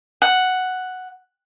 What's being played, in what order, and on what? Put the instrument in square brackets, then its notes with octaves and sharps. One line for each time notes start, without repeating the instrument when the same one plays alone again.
[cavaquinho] F#5